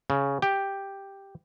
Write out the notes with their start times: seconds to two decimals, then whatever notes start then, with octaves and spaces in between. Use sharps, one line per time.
0.10 C#3
0.42 G4